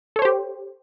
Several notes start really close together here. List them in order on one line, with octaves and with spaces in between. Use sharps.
A4 C#5 C5 G4